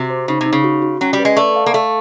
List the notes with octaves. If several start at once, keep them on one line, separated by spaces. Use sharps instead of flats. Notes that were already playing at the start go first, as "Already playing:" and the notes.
Already playing: C3 F#4
C5
C#3 D#4
C3
D#4
C#3
F#4
F#4
F#3 C#4
G3
B4
G#3
A3 D5
F5
A#3
A3 F5